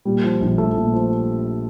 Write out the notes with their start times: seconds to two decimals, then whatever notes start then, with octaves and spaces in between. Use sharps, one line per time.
0.05 A#2 G3
0.24 F3
0.40 A#1
0.58 A#1 A3
0.76 A#2
0.93 F3